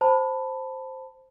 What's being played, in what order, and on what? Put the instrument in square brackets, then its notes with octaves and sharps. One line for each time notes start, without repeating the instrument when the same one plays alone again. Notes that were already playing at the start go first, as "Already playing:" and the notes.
[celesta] C5 A5 B5